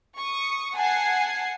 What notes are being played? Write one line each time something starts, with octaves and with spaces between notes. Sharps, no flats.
C#6 D#6
F#5 G#5 A5 G#6 C7